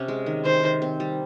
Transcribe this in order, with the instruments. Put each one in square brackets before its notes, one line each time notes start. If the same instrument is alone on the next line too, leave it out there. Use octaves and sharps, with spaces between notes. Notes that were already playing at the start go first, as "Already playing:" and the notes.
Already playing: [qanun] C3 C#4
G#3
D#3
[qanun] D#3 [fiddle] C5
[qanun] D#3
C4
G3